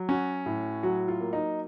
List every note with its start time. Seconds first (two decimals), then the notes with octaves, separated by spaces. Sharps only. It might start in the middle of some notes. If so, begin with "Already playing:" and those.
Already playing: F#3
0.09 C#4 F#4
0.46 A2
0.83 F#3 F#4
1.08 F4
1.21 A#3
1.33 D#4